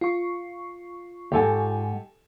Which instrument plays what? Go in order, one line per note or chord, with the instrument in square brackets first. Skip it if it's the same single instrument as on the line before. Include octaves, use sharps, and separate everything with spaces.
[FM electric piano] F4 C#6
[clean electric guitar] D2 G#2 [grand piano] G4 A4 G#5